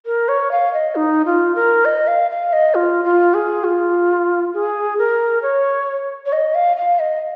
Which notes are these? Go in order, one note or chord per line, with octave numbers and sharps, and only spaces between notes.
A#4
C#5
F5
D#5
D#4
F4
A#4
D#5
F5
F5
D#5
F4
F4
G#4
F4
G#4
A#4
C#5
C#5
D#5
F5
F5
D#5